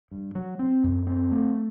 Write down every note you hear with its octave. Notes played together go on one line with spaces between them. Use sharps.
G2
F#3
C4
F#2
C4
A3